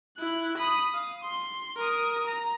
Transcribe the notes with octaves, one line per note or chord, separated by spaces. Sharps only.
E4 F#6
B5 D#6
F5 D#6
C6
A#4 D#6
A#5